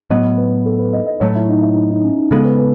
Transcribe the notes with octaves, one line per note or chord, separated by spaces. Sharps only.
A2 F#3 B3 D#5
B4
A4
B4
D#5
D#5
A2 F#3 A3 C#5
E4
D#4
E4
D#4
D#4
C#4
D#4
C#3 G#3 B3 A4
B4
B4